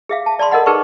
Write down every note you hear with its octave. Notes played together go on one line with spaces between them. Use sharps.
G#4 E5 F5
A5
D5 A5 B5 C6
A4 A#4 D#5 F#5 B5
D#4 G#4 A#4 B4 A5 C#6